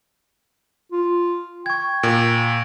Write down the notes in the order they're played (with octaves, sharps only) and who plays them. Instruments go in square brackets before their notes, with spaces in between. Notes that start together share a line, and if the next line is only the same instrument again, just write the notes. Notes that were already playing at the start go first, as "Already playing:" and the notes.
[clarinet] F4
[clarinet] G5 [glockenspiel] C#6 G#6
[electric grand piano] A#2 [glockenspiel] D7